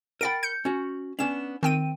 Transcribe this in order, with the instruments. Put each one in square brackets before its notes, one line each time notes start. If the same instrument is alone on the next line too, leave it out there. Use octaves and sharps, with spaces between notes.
[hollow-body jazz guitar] A#4 F#5 B5 [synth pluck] G5 A6 D7
[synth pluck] G6 C#7
[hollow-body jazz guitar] C#4 F#4
[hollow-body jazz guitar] B3 C#4 D4 [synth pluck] E7
[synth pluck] D#3 G5 D#7 [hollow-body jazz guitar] C4